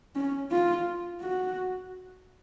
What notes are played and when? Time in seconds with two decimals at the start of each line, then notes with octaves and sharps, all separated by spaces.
0.15 C#4
0.51 F4
1.21 F#4